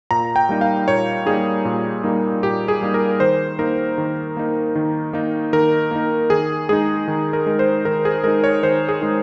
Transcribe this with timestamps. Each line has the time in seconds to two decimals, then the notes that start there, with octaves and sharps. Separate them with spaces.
0.11 A#2 A#5
0.36 G5
0.49 G3 A#3 D#4
0.61 F5
0.88 A#2 C#5
1.26 G3 A#3 D#4 G#4
1.65 A#2
2.04 G3 A#3 D#4
2.43 A#2 G4
2.68 G#4
2.81 G3 A#3 D#4
2.94 A#4
3.20 D#3 C5
3.59 A#3 D#4 A#4
3.98 D#3
4.37 A#3 D#4
4.75 D#3
5.13 A#3 D#4
5.53 D#3 A#4
5.91 A#3 D#4
6.30 D#3 G#4
6.69 G#3 D#4 G#4
7.08 D#3
7.33 A#4
7.46 G#3 D#4
7.59 C5
7.85 D#3 A#4
8.05 G#4
8.24 G#3 D#4 A#4
8.44 C#5
8.63 D#3 C5
8.88 G#4
9.01 G#3 D#4